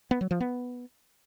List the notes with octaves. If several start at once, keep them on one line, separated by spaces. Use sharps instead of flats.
B3
F#3
F3
B3